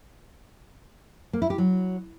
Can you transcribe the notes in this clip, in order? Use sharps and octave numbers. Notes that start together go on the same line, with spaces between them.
A#3
E4
G4
F#3